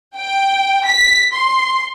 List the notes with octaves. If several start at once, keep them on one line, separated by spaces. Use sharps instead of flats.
G5
B6
C6